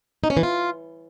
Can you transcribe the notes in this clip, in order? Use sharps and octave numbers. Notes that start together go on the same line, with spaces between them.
D#4
C#4
E3
F4